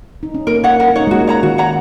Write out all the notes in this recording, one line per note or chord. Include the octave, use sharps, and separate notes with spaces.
D#4
C#4
A#3 A#4
A#3 C#5 F#5
D#4 A#4
D#4
C#4 C#5 F#5
G#3
A#3 F#4
G#3
C#5 F#5 A#5
D#3 F#4
C#5 F#5 A#5